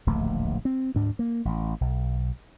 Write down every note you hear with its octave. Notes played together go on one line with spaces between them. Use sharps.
D1 A#1 D#2 A3
C4
D2 G#2 D4
A#3
A1
B1